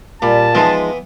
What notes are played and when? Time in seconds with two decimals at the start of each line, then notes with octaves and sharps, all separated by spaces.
0.22 A#2 G3 A5
0.55 E3 F3 G#3 B3 D#4